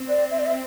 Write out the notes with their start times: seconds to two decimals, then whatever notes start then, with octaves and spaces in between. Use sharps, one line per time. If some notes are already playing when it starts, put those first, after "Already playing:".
Already playing: C4
0.09 D5
0.31 E5
0.39 D5
0.46 E5